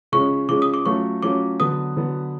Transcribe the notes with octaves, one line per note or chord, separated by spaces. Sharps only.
C#3 F3 G#3 C#4 C#6
C#3 F3 G#3 C#4 D6
D#6
D6
F#3 A3 C#4 F4 C#6
F#3 A3 C#4 F4 D6
D3 F#3 B3 D#6
D3 F#3 B3